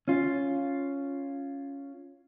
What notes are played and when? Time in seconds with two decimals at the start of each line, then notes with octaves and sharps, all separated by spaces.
0.08 C#4 F4